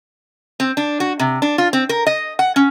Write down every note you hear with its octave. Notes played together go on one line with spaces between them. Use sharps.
C4
D4
F#4
C3
D4
F4
C4
A#4
D#5
F#5
C#4